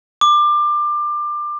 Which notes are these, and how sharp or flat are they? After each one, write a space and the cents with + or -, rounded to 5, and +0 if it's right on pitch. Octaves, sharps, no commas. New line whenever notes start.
D6 +25